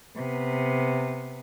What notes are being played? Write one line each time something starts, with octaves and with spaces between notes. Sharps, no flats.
C3 B3